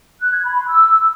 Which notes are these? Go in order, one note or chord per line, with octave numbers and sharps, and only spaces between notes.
F#6
G#6
B5
C6
E6